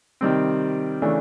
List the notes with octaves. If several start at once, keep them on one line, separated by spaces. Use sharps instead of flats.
C3 D#3 G3 C4
C#3 E3 A3 D4